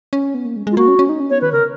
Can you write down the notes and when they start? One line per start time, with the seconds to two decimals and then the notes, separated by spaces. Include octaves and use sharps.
0.13 C#4
0.34 B3
0.45 A#3
0.56 G#3
0.67 G#3
0.72 F4
0.77 A#3 F#4
0.88 C#4
0.99 C#4
1.09 D#4
1.20 C#4
1.30 B3 C#5
1.41 D#3 B4
1.52 C#3 A#4